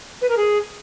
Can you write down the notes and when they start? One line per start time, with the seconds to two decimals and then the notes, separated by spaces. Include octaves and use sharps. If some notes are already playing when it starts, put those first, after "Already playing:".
0.21 B4
0.29 A#4
0.37 G#4